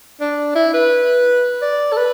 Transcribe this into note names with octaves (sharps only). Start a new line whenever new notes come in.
D4
E4
B4
D5
A4
B4